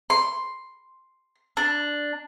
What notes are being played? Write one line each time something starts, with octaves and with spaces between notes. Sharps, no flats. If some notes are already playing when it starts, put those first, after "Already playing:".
C6
D4